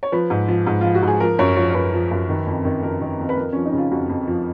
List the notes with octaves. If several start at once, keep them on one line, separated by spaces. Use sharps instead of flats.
C#5
F3 B4
G#2
F3
G#2
F3 F4
F#4
G#2 G#4
F3 A#4
F#2 C#5
F3 C#5
C#5
F#2 B4
F3
F#2
D#3
F2
D#3
F2 A#4
D#3
F2
B4
F2 A#4
F3 C#4
D#4
C#3 F4
F2 F#4
F2
F3